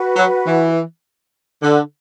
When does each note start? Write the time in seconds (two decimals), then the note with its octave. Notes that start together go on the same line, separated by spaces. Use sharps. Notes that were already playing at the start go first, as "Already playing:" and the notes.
Already playing: F#4 B4 F#5
0.16 F#3
0.46 E3
1.62 D3